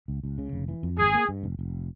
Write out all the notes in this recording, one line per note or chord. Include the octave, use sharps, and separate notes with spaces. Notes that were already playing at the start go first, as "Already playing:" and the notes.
C#2
C#2
C#3
F1
E3
F2
G#1 G#4
A#3
G2
F1
F1